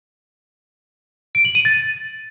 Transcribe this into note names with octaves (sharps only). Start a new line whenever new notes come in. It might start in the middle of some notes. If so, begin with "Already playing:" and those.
D7
F#7
D#7
A6